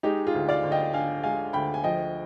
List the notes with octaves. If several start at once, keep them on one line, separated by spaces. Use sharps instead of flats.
G#3 D#4 G4
F4 G#4
D2
D5 F5
D2
D#5 G5
D3 F5 G#5
G#3 F5 G#5
D2 G5 B5
G#5
F3 D#5 G5